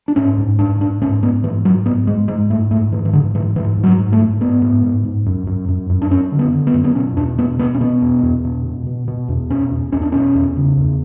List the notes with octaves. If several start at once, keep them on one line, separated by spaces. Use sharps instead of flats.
D4
G#2 C#4
G#2
G#2 D4
G#2 D4
G#2 C#4
G#2 B3
G#2 E3
G#2 F#3
G#2 B3
G#2 G#3
G#2 G#3
G#2 A3
G#2 A3
G#2 E3
E3
G#2 D3
G#2 E3
G#2 E3
G#2
F#3
G#2
A3
G#2
G#2 B3
G#2
G#2
G#2
F#2
F#2
F#2
F#2
D4
F#2 C#4
D3
B3
D3
B3
F#2
B3
B2 C#4
E2 D4
B2 B3
B2 B3
C#4
B2 B3
E2
E2
B2
B2
B2
B2
E2
B2 C#4
E2
E2 C#4
D4
B2 C#4
E2
C#3
E2